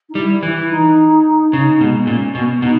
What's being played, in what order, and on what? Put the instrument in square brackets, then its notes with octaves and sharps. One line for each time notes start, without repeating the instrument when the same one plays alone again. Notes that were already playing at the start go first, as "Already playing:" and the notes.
[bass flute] D#4
[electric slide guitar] G3 [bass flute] E4
[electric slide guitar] E3 [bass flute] E4
[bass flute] D#4
[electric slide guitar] C#3 [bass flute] D#4
[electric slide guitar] B2 [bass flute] G#3
[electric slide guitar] A#2 [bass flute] C#4
[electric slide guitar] B2
[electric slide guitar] B2 [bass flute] D#4